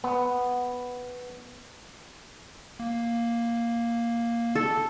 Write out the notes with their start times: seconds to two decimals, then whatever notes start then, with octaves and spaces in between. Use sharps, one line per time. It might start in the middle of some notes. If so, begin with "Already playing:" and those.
0.04 B3
2.80 A#3
4.55 A4